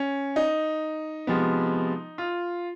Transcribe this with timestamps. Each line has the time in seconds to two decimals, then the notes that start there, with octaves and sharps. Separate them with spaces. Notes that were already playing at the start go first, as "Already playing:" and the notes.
Already playing: C#4
0.36 D#4
1.27 C3 F3 G#3 B3
2.18 F4